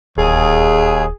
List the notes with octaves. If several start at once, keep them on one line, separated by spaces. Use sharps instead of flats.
D1 D#2 G#4